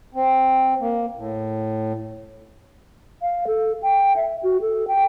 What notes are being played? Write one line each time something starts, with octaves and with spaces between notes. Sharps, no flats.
C4
A#3
A2
F5
A4
G5
E5
F#4
A4
G5